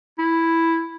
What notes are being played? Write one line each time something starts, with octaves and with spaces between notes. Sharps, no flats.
E4